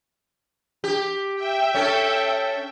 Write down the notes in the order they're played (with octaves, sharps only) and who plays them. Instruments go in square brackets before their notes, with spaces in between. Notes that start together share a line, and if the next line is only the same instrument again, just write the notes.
[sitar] G4
[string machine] E5 G5
[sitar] C#4 A4